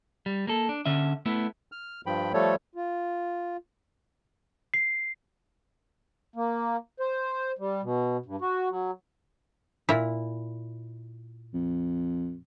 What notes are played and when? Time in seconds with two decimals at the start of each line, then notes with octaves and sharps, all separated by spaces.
0.26 G3
0.47 A#3 A4
0.69 D4
0.86 D3 C#4 E5
1.26 A3 B3 E4
1.72 F6
2.06 G2 F3 G5 B5
2.34 F3 G3 A3 A4 C#5
2.75 F4
4.74 C7
6.36 A#3
7.00 C5
7.59 G3
7.83 B2
8.26 G2
8.41 F#4
8.69 F#3
9.89 A#2 E4
11.54 F2